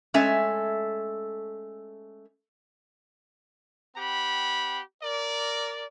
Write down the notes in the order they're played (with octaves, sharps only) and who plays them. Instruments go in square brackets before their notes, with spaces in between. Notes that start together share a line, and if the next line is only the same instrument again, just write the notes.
[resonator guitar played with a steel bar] G#3 A3 C#4 A4 E5 G#5
[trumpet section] C4 G4 F#5 B5
A#4 D5